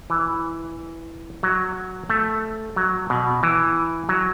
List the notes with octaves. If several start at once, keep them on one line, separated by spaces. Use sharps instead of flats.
E3
F#3
A3
F#3
B2
E3
F#3